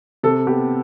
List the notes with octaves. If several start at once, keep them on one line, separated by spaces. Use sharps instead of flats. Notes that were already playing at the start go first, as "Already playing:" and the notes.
C3 A4
B3 G4